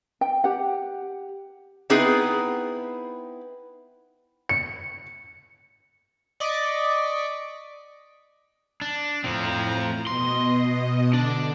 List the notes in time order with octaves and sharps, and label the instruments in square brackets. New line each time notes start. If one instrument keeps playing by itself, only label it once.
[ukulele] G5
G4 F#5
[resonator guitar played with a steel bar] B3 C4 D#4 E4 G#4 B4
[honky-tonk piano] C#7
[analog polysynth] D5 D#5 C#6 D6 B6
[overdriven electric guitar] D4
[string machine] A2 A#5 [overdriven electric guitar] F3 C4
[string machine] B2 D#5 [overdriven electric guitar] C6
[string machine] D3 [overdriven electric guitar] D4